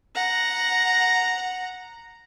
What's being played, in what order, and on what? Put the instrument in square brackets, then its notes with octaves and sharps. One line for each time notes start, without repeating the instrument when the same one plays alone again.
[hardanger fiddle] F#5 A#5